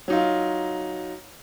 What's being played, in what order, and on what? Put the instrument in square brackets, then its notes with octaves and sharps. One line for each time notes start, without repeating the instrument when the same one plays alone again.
[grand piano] F#3 D#4 F4